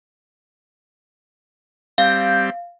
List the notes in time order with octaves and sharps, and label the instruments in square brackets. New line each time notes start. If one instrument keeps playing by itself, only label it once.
[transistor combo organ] G3 C4 [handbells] F5